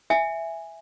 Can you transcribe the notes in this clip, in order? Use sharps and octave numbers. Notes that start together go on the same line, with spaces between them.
E5 G#5